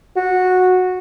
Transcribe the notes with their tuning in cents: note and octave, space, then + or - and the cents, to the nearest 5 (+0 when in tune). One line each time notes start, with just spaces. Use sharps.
F#4 -10